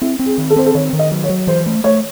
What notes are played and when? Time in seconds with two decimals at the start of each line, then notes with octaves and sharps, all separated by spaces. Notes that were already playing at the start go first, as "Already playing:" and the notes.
0.01 C4 E4
0.19 C4
0.26 G#4
0.38 D#3
0.50 A4
0.56 C4 C5
0.66 A4
0.75 D#3 C#5
0.93 D#3
0.99 D#5
1.11 F#3
1.23 C#5
1.29 F#3
1.47 E3 C5
1.66 A3
1.84 A3 C#5